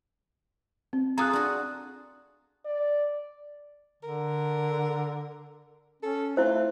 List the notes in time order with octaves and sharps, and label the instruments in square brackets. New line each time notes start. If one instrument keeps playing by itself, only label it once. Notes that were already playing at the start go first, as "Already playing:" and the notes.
[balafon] C4
[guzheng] F4 G#4 A4 [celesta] A#5 D#6 F#6
[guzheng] D4 F#4
[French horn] D5
[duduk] D3 [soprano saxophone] A#4
[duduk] C#4 [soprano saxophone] A4
[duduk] A3 [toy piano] E4 C5 [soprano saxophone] F4